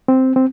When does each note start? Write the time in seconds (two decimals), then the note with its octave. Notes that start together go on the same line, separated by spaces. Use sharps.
0.08 C4
0.36 C4